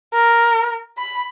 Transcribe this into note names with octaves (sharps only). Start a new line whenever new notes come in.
A#4
B5